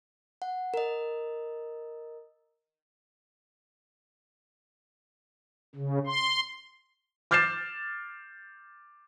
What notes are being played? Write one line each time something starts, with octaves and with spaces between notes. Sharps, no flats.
F#5
A#4 D#5
C#3
C6
D6 F6 G6 A6 C7 E7